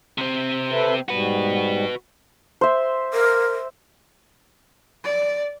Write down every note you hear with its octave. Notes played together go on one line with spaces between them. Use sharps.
C3 C4
A4 B4 E5
G#2 G3 F#4 B4
C5 E5
A#4
D5